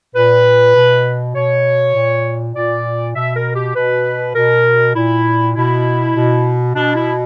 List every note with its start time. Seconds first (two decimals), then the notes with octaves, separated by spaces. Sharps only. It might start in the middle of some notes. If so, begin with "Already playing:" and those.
0.15 A#2 B4
0.75 B2
1.35 B2 C#5
1.95 A#2
2.55 A#2 D5
3.15 B2 E5
3.35 A#4
3.55 G4
3.75 B2 B4
4.35 B2 A#4
4.95 A#2 E4
5.55 B2 E4
6.15 B2
6.76 B2 D4
6.95 E4